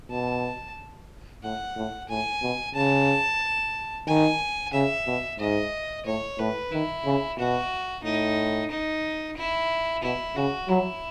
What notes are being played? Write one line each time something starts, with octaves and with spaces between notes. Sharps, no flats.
B2 A5
A2 F#5
A2
A2 G#5
B2
C#3 A5
D#3 G#5
C#3 E5
B2
G#2 D#5
A2 C#5
A2 B4
D#3 E4
C#3
B2 F#4
A2 D#4
D#4
E4
B2 E4
C#3 F#4
F#3 E4